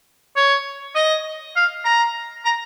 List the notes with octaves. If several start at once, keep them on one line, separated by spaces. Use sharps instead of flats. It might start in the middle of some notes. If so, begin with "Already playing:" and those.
C#5
D#5
F5
A#5
A#5